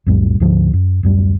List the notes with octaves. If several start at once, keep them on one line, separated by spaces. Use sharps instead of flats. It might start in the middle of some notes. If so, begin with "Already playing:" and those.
B1 F2 A2 G3
D2 G#2 D3 F3
F#2
D1 F#2 G3